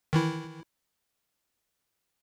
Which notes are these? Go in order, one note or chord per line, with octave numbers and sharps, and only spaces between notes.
D#3 E3 E4